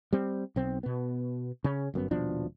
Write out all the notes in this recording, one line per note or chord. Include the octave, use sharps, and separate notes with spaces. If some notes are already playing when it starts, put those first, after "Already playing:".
G3 C4
B1 C4
B2 B3
C#3 C#4
G1 F#2 B3
D#1 B2 F3 D4